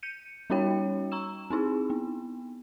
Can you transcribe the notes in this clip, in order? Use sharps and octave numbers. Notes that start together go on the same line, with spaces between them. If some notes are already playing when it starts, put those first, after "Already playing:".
G6 C#7 D#7
G3 C#4 D#4 F#4 C#5 G5
A#5 C#6 E6 E7
C4 D#4 E4 G#4
B3